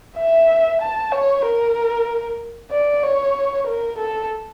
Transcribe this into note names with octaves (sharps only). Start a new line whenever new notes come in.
E5
A5
C#5
A#4
D5
C#5
A#4
A4